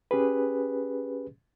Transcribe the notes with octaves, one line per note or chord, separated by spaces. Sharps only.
C#4 G4 G#4 B4